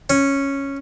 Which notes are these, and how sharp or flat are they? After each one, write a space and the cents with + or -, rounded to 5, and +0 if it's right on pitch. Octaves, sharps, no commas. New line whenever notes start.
C#4 -5